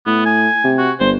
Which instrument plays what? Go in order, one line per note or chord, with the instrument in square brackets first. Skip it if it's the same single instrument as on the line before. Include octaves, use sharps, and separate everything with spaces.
[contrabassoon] A2 [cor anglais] B3
[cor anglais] G#5
[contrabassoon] C3
[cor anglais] F#4
[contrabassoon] G1 [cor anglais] C5